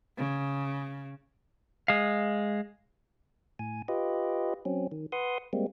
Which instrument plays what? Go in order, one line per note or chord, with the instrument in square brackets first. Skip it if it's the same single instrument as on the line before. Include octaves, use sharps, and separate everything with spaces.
[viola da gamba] C#3
[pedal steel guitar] G#3 F5
[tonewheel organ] A2 G#5
F4 G4 B4 D#5
F#3 C4 C#4
D#3
B4 F#5 C6 D#6
G3 G#3 A#3 C4